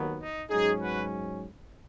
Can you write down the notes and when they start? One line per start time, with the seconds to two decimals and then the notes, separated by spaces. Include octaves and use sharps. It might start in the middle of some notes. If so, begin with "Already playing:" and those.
Already playing: D#2 D#3 F#3 B3
0.21 D#4
0.50 G#2 F#3 C#4 D#4 G#4
0.80 F#4 B4